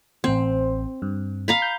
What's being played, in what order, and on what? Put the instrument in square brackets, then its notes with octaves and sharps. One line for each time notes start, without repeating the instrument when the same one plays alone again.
[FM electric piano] A1 C5 [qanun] C4
[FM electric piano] G2
[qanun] F5 A#5 B5
[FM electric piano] G6